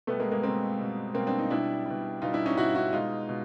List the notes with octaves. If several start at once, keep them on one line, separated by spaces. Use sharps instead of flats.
B2 G3 A3 B3
G#3 A#3
G#3 A#3
B2 G3 A#3 C4
B2 G3
B2 G3 A#3 C4
C4 D4
D#4
B2 G3 D4 E4
B2 G3
B2 G3 D#4 F4
D4 E4
C#4 D#4
B2 G3 E4 F#4
E4 F#4
B2 G#3 D#4 F4
B2